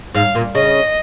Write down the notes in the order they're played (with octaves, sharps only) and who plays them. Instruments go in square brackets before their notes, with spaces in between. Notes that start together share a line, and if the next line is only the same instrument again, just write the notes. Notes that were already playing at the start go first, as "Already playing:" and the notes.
[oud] G#2 [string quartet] F5
[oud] A#2
[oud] C#3 [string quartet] D#5